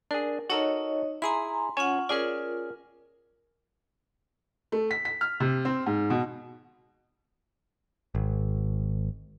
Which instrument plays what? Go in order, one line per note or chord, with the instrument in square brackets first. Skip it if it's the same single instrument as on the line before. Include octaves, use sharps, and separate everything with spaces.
[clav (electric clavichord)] D4 G#4 [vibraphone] A#4
[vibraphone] D#4 C#5 D#5 [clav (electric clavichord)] F#4 A4 A#4
[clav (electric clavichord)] E4 G#4 [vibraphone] G#5 A#5 C6
[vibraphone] C#4 F4 F#5 [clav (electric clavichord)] C#5 G#5
[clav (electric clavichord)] C#4 G#4 D5 [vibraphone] F4 A#4
[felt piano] A3
B6
B6
F6
C3
C4
G#2
B2
[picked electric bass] G#1